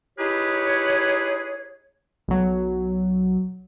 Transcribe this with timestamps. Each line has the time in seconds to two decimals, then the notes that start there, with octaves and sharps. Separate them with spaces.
0.19 D#4 E4 G4 G#4 B4 C#5
2.28 B1 F#3